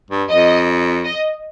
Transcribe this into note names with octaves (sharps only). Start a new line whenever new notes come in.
G2
F2 D#5
D#5